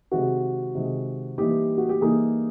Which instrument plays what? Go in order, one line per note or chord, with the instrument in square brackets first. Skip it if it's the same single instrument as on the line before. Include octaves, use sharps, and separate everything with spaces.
[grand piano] C3 D#3 G#3 [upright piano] F#4
[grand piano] C3 D#3 G#3
[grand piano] E3 G3 A#3 D#4 [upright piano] G4
[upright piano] F#4
G4
[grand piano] E3 G3 A#3 D#4 [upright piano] G#4